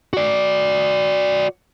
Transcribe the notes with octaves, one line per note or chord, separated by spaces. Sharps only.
F#4 D5